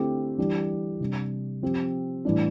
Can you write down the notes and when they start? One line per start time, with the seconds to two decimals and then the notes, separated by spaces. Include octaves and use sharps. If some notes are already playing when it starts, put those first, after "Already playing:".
Already playing: D3 A3 C4 E4 G4
0.38 E3 G3 D4 G4
1.00 C3 G3 D4
1.62 F3 C4 G4
2.25 A2 E3 G3 D4